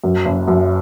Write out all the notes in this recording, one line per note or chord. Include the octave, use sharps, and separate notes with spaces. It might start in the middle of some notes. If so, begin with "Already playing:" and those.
F#2
F#1
F#2